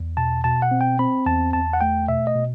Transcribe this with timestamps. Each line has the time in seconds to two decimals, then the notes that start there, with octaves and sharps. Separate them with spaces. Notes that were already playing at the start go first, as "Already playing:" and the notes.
Already playing: E2
0.17 B2 A5
0.44 B2 A5
0.62 F#5
0.71 C4
0.81 G5
0.99 C4 B5
1.26 E2 A5
1.53 E2 A5
1.73 F#5
1.81 A3 G5
2.08 B2 E5
2.27 D#5
2.36 B2